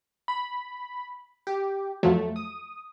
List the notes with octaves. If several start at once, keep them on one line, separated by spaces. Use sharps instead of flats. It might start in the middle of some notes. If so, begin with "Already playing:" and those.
B5
G4
F2 F3 F#3 A3
D#6